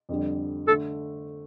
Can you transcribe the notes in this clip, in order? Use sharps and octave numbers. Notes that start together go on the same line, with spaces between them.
F2 D3 G3 D4
D3 A3 A4